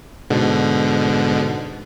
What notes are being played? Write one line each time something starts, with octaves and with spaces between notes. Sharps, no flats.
G#2 B2 D3